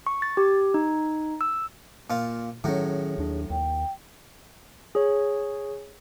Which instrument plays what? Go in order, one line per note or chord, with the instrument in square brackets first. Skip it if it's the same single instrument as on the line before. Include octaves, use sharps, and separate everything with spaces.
[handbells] C#6
A6
G4
D#4
E6
[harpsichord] A#2 F4
[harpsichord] A2 F#3 [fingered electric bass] D#3 C#4 [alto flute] G#4
[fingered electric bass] D#2 D4
[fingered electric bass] D#2 [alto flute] G5
[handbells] G#4 C#5